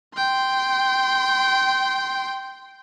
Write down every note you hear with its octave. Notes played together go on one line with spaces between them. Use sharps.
G5 C6